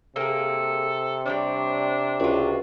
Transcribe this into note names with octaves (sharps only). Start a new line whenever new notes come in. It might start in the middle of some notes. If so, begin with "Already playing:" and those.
C3 A#3 G#4 A4
G3 D4 C#5 D5
C#2 F4 F#4